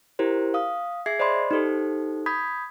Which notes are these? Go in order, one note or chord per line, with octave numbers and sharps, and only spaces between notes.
E4 G4 A#4 C5
F5 D#6
G#4 E5 G#6 C7
C5 D5 D#5 B5 C6
D#4 G4 A4 C5
B5 D#6 G6 G#6 B6